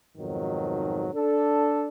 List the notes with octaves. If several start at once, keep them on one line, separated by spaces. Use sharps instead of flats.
F2 G#2 B2 D#3 F#3
D4 A4